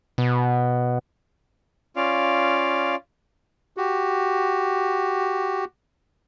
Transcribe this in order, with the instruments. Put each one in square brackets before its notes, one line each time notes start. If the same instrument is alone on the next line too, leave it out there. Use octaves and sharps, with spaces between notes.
[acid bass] B2
[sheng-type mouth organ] C#4 F4 D5 F5
[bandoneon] F#4 G4